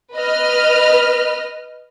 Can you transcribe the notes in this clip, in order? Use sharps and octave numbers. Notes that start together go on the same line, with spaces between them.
B4 D#5 F6